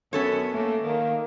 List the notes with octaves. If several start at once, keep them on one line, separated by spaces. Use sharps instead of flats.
F#2 B3 C#4 A4 C#5
A3 A#3
D#3 A#3